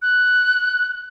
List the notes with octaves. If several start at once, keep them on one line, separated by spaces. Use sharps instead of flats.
F#6